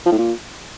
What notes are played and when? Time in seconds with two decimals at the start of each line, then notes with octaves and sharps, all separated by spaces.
0.06 F3
0.12 A2
0.18 A#2